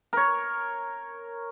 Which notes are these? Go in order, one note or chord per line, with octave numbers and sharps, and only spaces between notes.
A#4 C#5